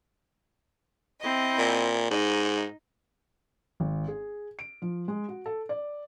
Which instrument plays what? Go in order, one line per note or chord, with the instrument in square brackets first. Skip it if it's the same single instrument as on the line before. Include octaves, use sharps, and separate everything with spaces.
[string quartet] C4 E4 D#5
[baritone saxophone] A#2
[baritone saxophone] G#2 [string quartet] D#4
[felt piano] G#1
G#4
D7
F3
G#3
F#4
A4
D5